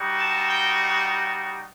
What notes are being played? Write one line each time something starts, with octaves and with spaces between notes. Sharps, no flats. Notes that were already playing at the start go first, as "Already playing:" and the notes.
Already playing: G3 D#4 F#4
A5
G5